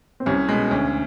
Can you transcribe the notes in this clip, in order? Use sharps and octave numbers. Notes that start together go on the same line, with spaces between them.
C4
C2 C#4
B2 G#3
D2 C#4